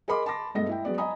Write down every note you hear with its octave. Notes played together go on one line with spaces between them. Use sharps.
G#4 A#4 D#5 B5 C6 D6
A5 B5 C6 D6 A#6
G2 B2 G#3 A3 D#5 A#6
E4 G5
F#3 G#3 B3 D5
D#5 G#5 A#5 B5 D#6